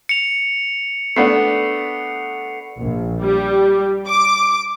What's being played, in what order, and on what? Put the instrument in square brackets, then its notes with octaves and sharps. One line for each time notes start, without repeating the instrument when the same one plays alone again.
[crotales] C#7 F7
[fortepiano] A3 B3 D4 [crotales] C7
[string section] A#1
G3
D6